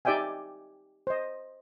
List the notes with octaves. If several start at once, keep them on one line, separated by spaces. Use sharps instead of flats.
D#4 G4 D5 E5 G5 G#5
C5 D#5